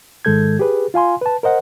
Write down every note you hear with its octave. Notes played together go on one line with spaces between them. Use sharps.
G#2 D#3 G#3 A4 G6 G#6
G4 G#4 B4
F4 F5 G#5 C6
B4 A5
A#4 C5 D#5 F#5